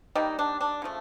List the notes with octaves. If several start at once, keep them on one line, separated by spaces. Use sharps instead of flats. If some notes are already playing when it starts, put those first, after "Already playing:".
D#3 G3 A#3 D#4
D4
D4
C#3 F3 A3